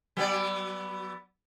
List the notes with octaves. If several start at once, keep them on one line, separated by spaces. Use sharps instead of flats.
F#3 B3 D5